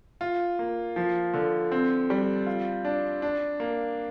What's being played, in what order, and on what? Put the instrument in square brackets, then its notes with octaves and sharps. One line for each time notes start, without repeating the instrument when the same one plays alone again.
[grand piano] F4
A#3
F3
D3
C4
G3
F4
D4
D4
A#3